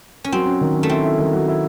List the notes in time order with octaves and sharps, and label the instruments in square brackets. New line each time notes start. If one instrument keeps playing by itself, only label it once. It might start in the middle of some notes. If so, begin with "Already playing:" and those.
[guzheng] C#4
[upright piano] F#3 [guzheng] C4
[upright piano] C#4
D#3
C#4
[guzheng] A3
[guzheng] C4 [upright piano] E4
[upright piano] E4
D#3
F#3
E4